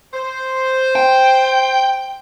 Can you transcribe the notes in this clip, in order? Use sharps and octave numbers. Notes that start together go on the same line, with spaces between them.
C5
G5